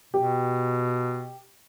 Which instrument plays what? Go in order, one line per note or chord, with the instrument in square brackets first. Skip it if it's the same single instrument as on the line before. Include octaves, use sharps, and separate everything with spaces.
[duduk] B2 [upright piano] G4